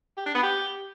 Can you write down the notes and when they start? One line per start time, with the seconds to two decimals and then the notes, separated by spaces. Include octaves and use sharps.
0.17 G4
0.26 D4
0.35 B3
0.43 G4